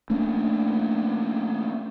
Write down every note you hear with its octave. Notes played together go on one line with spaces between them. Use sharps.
A3 A#3 C#4 D4